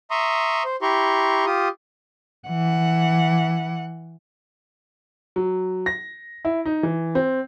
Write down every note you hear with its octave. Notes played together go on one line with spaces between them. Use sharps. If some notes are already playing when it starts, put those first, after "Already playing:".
E5 A#5 C6 C#6 D#6
C5
E4 G4 A#5 C6 C#6
F4 G4 D#6
E3 F#5
F#3
A#6
E4
D#4
E3
C4